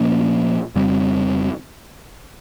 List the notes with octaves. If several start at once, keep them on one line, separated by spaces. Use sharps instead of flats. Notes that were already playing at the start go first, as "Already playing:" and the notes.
Already playing: A#2 F3 A#3 C#4
F2 C#3 G3 C4